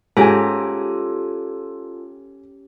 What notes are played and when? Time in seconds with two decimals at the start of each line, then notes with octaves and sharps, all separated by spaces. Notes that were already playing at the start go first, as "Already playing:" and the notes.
0.17 G#2 C#4 F4 G4 A4 G#5 A#5